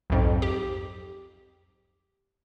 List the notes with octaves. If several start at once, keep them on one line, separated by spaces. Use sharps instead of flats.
B1 F2 G#2
G4